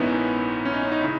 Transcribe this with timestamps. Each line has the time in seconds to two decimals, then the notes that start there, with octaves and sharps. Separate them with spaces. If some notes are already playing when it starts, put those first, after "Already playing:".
Already playing: A#1 G#2 D#3 B3 C#4 D#4 E4
0.65 C#4
0.74 D#4
0.83 C#4
0.92 D#4
1.01 C#3 E4